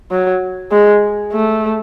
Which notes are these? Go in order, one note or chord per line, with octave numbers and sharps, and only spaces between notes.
F#3
G#3
A3